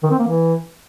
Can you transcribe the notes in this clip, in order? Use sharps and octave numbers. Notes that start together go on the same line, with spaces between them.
D#3
C4
A#3
E3